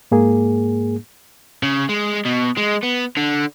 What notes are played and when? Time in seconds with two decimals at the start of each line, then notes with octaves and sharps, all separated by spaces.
0.11 G#2 A#3 G#4
1.63 C#3
1.89 G#3
2.25 B2
2.57 G#3
2.83 B3
3.17 D3